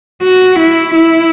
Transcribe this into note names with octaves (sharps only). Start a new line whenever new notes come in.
F#4
E4
E4